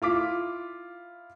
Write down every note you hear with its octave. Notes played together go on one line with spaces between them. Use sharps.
E4 F4 D6 B6